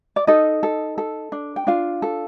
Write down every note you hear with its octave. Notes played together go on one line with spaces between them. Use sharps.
D5
D#4 A4 D#5
A4
A4
D4
G5
D4 F4 F5
A4